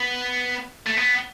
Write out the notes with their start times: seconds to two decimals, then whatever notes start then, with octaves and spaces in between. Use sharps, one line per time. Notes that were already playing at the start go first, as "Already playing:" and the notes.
Already playing: B3
0.87 A3
0.97 B3